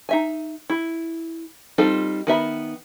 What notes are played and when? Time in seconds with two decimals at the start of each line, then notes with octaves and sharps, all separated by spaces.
0.09 D#4 E5 G#5
0.70 E4
1.78 G3 C4 D#4 F4 A4
2.27 D#3 B3 E5 B5